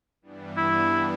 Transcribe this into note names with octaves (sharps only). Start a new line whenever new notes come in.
G2 E3 G3 B3 D4
E4